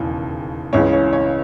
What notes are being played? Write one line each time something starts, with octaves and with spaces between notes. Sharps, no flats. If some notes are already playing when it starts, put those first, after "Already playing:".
Already playing: E1 D#2 C#3 E3
C#2 C#3 E3 C#5
C#5
C#5